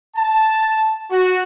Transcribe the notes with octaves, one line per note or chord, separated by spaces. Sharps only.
A5
F#4